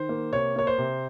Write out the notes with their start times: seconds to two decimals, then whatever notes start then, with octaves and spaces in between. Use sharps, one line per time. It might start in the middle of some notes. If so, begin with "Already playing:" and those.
Already playing: D#3 C5
0.09 A#3
0.32 C3 C#5
0.56 A#3 C#5
0.67 C5
0.78 C3